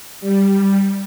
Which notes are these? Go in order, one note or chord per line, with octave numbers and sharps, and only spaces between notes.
G3